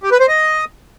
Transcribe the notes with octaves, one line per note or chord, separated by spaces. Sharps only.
G4
B4
C5
D#5